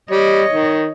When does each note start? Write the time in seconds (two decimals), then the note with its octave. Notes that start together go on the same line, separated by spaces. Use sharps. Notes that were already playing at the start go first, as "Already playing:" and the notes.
0.11 G3 C#5 D#5
0.52 D#3